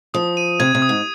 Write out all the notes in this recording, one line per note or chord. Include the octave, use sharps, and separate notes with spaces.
F3 D#6
D#7
C3 G#6
C3
D#6
G#2